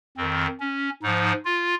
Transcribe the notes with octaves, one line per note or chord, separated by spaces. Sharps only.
F2 D#3 C4
C#4
G#2 F3 D#4
F4